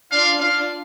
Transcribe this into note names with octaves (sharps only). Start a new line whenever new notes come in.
D4 F4 F5
D4 F4 F5